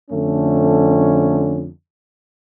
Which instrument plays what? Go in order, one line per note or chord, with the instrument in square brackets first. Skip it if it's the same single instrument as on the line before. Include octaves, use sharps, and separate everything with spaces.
[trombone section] F2 D3 A3 C#4